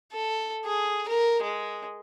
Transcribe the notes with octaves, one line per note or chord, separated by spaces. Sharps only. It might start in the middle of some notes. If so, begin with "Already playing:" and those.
A4
G#4
A#4
G#3